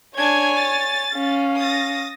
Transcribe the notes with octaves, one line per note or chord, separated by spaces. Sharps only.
D4 C#5 G#5 G#6
A6
C#4 F5
D#6 A6 A#6